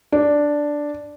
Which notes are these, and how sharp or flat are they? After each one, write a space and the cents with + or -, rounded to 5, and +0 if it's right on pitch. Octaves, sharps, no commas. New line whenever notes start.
D4 +0